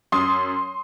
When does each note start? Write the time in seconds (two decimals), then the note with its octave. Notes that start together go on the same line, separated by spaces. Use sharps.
0.12 F#2 C6 D#6